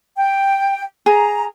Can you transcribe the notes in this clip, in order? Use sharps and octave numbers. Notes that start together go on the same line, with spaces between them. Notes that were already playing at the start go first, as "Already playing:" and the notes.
G5
G#4 A#5